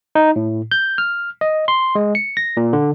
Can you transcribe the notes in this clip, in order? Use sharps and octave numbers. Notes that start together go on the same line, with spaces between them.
D#4
A2
G6
F6
D#5
C6
G#3
C#7
A#6
A#2
D3